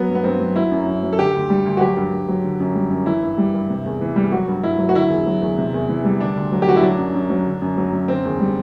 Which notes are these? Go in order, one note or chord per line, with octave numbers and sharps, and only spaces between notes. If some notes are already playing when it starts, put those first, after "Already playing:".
Already playing: F#3 B3
G2
B3
G2 C4
F#3
F#3 E4
F#2
F#2
F#3
A4
D3 G4
D2
G3
D2
F#4
F#3 G4
G2
G2
F#3
D3
F#2
G3
F#2
E3 E4
G2
G3
G2
C3
E2
E3
G3
F#3 F#4
G2
G2 E4
F#3
F#4
D3 E4
E2
F#3
E2
C3
E2
E3
G3
D3 D4
D2
F#3
G4
D2 F#4
E4
F#3 D4
F#2
F#2
F#3
D3
F#2
F#3
F#2
D3 C4
E2
G3